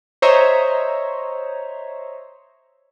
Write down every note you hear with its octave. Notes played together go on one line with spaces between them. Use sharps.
C5 C#5 D#5 E5 A#5